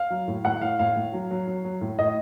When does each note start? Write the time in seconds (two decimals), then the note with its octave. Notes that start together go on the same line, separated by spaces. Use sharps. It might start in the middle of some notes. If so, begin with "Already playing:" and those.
Already playing: F5
0.10 F#3
0.28 A2
0.45 A2 F#5
0.61 A2 F5
0.79 A2 F5
0.96 A2
1.13 F#3
1.31 F#3
1.47 F#3
1.65 F#3
1.81 A2
1.98 A2 D#5